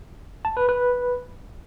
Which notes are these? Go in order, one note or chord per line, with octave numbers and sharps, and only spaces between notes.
A5
B4
B4